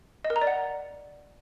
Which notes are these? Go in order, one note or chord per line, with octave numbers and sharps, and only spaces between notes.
D#5
A#4
A#5
D5
F#5